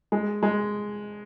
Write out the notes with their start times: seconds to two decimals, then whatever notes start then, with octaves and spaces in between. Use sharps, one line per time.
0.12 G#3
0.43 G#3